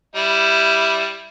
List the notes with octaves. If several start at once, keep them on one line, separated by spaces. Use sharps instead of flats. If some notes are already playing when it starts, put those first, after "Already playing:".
G3 E4